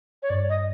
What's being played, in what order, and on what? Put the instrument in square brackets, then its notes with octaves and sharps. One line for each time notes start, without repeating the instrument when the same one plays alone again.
[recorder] C#5
[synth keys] G2 [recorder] D5
[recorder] D#5